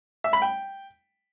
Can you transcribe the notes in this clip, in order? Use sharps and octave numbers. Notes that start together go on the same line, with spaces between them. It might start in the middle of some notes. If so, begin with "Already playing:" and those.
E5
B5
G5